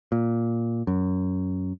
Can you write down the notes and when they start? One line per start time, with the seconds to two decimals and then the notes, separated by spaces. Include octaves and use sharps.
0.12 A#2
0.87 F#2